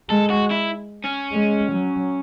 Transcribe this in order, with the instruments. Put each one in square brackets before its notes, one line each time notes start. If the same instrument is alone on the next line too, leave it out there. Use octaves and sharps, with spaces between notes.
[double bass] G#3 [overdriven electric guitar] A4
[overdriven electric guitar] F#4
E4
C#4
[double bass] G#3
F#3